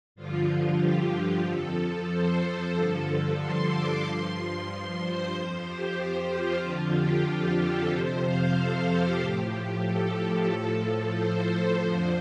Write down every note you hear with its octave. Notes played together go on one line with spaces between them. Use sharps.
G2 D3 F3 F4
F4
G4
G4
F2 F3 A4
C5
G2 D3 F3 A4
A4
C6
D6
G2 F3 C6
C6
C5
F2 F3 C5
G4
F4
F2 D3 F3
G4
A4
F2 C3 F3 C5
F5
A4
G4
A2 F3 G4
G4
A4
A4
A2 F3 A4
C5
C5
F2 D3 F3